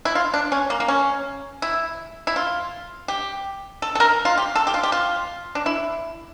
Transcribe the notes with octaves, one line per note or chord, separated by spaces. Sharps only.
E4
F4
D4
C#4
A#3
A#3
C#4
E4
E4
F4
G4
A4
A4
A#4
F4
G4
A4
G4
F4
G4
F4
D4
E4